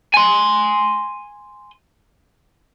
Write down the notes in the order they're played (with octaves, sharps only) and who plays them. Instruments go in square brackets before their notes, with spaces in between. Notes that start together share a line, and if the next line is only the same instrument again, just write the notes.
[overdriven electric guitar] G#5 C6